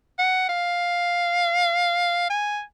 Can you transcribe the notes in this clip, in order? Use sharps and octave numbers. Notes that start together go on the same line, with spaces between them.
F#5
F5
G#5